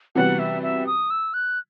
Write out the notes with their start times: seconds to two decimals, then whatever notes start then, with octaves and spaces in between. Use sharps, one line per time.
0.15 C3 E3 G3 B3 F#4 F#5
0.39 E5
0.63 E5
0.87 D#6
1.10 E6
1.34 F#6